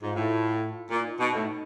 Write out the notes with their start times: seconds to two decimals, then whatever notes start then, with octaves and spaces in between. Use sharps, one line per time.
0.01 G#2 F4
0.16 A2
0.90 A#2 F4
1.00 E4
1.05 D#4
1.20 B2 D#4
1.35 A2